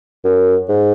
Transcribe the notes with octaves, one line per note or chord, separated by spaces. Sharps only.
F#2
G#2